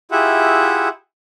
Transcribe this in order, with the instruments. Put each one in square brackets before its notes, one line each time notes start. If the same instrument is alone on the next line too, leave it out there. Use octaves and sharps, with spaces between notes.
[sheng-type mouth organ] E4 F4 G4 G#4 E5 F#5